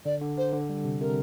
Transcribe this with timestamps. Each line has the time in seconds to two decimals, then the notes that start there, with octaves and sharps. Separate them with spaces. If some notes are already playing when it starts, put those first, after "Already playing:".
0.05 D3 D5
0.21 D3
0.38 D3 C5
0.53 D3
0.69 G3
0.84 C3
1.00 C3 A#4